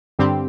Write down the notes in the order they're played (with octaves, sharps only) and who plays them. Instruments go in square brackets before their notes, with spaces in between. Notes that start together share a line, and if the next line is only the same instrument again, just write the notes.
[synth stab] G2 D3 G3 C4 G4